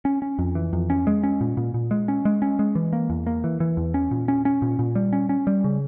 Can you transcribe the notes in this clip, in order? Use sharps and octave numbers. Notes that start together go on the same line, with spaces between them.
C#4
C#4
F2
E3
F2
C#4
G#3
C#4
A#2
A#2
A#2
G#3
C#4
G#3
C#4
G#3
E3
A#3
E2
A#3
E3
E3
E2
C#4
A#2
C#4
C#4
A#2
A#2
G3
C#4
C#4
G3
C#3